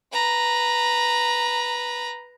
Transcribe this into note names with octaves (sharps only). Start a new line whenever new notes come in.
B4 A#5